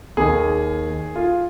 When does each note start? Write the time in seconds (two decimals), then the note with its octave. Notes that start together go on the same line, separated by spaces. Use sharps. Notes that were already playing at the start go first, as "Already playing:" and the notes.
0.17 D#2 D#3 G#4
1.16 F4